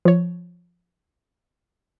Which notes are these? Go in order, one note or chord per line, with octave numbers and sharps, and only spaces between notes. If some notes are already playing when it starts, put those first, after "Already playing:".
F3 C#5